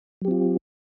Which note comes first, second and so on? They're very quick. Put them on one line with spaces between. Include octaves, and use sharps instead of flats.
F#3 G4 C4 F4